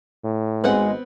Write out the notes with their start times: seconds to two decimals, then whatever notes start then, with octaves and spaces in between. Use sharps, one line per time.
0.24 A2
0.64 G#1 G#3 B3 C4 F#5